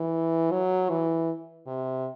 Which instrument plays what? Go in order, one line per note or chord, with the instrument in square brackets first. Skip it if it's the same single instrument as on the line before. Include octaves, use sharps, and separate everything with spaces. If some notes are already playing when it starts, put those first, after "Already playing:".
Already playing: [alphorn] E3
F#3
E3
C3